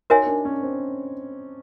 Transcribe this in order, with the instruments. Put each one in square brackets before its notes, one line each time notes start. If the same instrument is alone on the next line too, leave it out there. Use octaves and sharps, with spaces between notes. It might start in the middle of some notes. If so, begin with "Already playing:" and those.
[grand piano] D#4 [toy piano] F#4 A#4 C#5 E5 G#5
[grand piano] D4
C#4
C4